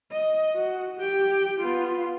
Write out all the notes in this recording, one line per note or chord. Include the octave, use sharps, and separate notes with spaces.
D#5
F#4
G4 G5
B3 F4